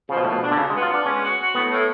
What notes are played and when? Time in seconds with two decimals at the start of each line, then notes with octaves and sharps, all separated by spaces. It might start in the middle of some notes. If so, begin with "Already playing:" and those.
0.09 C#3 F3
0.17 B2
0.25 A2 F3
0.33 B2
0.42 D4
0.51 D3
0.57 C#3 F#3
0.70 G#3 B3
0.82 F4
0.91 B3 D4
1.06 G#3 C#4
1.23 F#4
1.39 F#4
1.55 A2 B3
1.71 A2